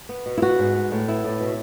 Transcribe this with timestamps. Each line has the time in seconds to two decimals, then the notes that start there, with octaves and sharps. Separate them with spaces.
0.09 B3
0.26 B2
0.37 E4
0.42 B3 F#4
0.59 G#2
0.76 B3
0.92 A2
1.08 B3 E4
1.24 A2
1.41 B2